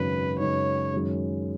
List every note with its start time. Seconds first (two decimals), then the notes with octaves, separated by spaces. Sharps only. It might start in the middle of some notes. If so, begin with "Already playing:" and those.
Already playing: G#1 F#2 C#3 B4
0.39 F#2 C#3 G#3 D#4 C#5
0.93 F#2 D#3 G#3 C#4